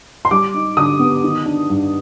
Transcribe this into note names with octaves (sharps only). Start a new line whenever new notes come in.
C6
G3 D6
D#4
D3 D#6
B3
D#3
D4
G2